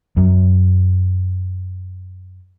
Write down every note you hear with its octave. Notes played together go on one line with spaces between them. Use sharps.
F#2 F#3